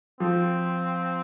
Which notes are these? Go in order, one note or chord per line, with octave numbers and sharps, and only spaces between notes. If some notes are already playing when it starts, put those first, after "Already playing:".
F3 C4